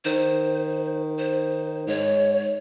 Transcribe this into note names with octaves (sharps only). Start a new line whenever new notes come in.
D#3 C5
C5
G#2 C#5